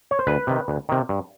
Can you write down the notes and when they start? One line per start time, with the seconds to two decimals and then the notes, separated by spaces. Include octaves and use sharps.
0.11 C#5
0.19 C5
0.27 D2 B4
0.47 C3 D#3
0.68 D2
0.89 C3 D#3
1.09 G2